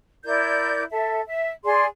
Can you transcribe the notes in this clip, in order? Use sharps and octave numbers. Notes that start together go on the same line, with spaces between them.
E4 A#4 D5 G6
A4 E5
E5
G#4 D5 C6